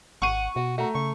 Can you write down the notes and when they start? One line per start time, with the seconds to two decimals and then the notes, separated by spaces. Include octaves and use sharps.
0.22 G#1 F#5 C#6 D#7
0.56 B2 F#4
0.78 A3 F#4 A#5
0.95 C#3 C#6